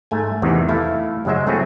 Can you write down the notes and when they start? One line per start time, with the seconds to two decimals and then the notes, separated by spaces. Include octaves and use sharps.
0.11 G#2 A3 G#5
0.42 E2 C3 D#3 E3
0.69 A3 E4 A4 F5
1.25 F#2 C#3 F#3 G#3 C5 E5
1.47 A3 A#3 C4 E4 F#4 G#4